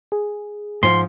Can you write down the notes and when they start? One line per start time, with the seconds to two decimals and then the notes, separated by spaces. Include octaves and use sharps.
0.12 G#4
0.83 G#2 F3 C6